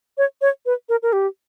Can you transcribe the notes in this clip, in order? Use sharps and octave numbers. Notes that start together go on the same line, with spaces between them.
C#5
C#5
B4
A#4
A#4
G4